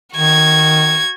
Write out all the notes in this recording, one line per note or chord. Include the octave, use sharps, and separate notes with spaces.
D#3 F#4 G#6